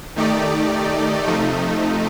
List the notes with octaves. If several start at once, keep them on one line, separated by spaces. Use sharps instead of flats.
D#3 A3 D#4 G4 D5
C3 F3 A3 D#4